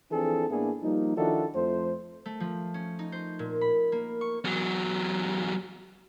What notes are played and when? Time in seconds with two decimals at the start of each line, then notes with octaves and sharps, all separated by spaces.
0.11 E3 F3 C4 D4 G#4 A4
0.50 A2 A#3 B3 D4 E4 G#4
0.83 F3 G3 A#3 D#4
1.17 D#3 F3 D4 E4 F#4 A4
1.55 F2 A3 C5
2.26 A3
2.40 F3
2.74 C#4
2.99 D#4
3.12 C5
3.39 A#2
3.61 B5
3.92 A#3
4.21 C#6
4.44 E2 F#3